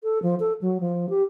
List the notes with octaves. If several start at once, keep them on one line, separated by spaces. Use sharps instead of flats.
A4
F3
A4
F#3
F3
G4